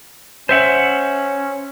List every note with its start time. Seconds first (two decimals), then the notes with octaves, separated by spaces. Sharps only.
0.49 C#4 C5 E5 F#5